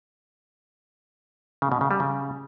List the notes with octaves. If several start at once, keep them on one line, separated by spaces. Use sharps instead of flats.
C#3
B2
C#3
G3
C#3